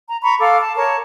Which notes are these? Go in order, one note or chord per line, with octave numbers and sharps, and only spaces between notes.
A#5
A#5 B5 C#6
A4 F5 D6
A5
A#4 C#5 A5 C#6